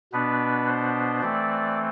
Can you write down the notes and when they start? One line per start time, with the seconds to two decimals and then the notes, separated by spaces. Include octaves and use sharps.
0.12 B2 B3 D4 B4
0.67 C5
1.21 E3 A3 C4 D5